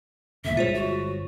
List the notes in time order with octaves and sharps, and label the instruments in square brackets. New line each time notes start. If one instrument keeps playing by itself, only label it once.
[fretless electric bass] E1 A#2 D3 [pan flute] E5
[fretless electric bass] G1 G#3 [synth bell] F4 C5 C#5
[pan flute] F#4